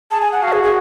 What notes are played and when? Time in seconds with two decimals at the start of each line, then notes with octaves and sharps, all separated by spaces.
0.11 G#4 A5
0.21 G#5
0.32 F#5
0.42 F#4 F5
0.52 G#4
0.63 G#4